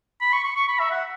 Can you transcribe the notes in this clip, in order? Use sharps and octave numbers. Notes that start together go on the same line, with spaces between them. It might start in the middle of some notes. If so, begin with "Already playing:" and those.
B5
C#6
C#6
C#6
B5
E5
F#5